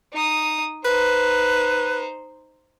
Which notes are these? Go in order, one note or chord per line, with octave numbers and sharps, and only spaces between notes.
D#4 D#6
D#4 B4 C5